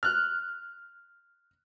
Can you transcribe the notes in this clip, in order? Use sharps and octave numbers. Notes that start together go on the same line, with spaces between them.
F6 F#6